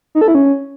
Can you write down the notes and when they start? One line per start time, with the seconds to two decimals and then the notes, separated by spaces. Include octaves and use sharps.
0.15 D#4
0.21 A4
0.28 E4
0.35 C#4